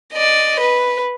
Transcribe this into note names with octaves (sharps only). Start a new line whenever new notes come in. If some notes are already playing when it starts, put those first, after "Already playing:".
D5 D#5
B4